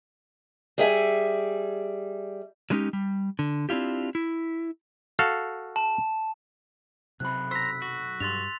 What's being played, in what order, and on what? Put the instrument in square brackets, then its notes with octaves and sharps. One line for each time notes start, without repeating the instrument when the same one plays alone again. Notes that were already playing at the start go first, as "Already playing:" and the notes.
[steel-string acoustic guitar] G3 G#4 E5 G#5
[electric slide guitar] F#3 G#3 A3 C#4 D#4 G4
G3
D3
C4 D4 E4 F4 G4
E4
[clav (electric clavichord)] F#4 A4 F5
[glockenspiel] A5
[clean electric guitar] B1 F#2 B5 [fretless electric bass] C3 [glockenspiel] F#6
[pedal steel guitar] C5 A#5 [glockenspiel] E6 B6
[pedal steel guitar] F#4
[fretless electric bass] G2 [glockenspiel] C6 A6 F7